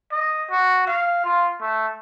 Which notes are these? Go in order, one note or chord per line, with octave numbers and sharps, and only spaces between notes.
D#5
F#4
F5
F4
A3